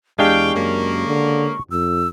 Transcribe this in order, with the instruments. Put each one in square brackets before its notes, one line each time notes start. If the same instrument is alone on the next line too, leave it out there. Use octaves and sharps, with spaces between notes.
[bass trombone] E2 [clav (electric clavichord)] G#3 D4 G4 [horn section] F5 G5 [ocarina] C#6
[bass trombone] F#2 [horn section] C#3 A#3
[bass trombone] D3
[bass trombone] F2 [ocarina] E6